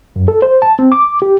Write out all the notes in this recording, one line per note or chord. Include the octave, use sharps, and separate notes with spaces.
F#2
A4
C5
A5
C4
D6
G4